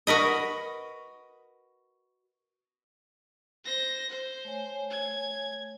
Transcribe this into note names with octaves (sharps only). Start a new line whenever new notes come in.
F#4 A#4 B4 D#5
C5 A#6
C5
A3 C#5 G#5
G#6